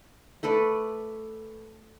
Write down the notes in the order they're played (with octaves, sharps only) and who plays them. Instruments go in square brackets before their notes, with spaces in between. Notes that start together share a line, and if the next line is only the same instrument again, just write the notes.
[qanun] A3 A4 B4 D5